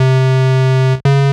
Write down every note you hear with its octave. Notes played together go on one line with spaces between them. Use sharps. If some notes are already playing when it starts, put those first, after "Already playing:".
Already playing: C3
C#3